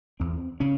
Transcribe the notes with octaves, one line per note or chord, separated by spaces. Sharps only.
E2 C4
C#3 C#4